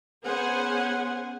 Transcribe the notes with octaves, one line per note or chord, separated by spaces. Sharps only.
B3 C#4 G#4 C5 F#5 G#5